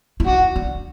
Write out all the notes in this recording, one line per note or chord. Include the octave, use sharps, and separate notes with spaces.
E4
D4 F#4
D4